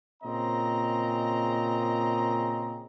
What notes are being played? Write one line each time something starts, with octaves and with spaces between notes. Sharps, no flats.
A#2 C#3 C4 D#5 A#5